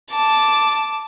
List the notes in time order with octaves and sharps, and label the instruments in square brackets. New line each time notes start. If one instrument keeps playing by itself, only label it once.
[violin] A5 [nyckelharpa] D6